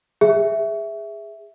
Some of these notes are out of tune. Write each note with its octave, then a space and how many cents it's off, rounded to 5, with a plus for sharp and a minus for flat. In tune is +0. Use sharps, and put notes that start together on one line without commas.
G#4 -15 E5 +0